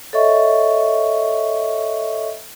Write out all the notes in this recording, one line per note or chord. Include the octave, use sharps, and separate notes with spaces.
A4 C#5 D#5 E5 C#6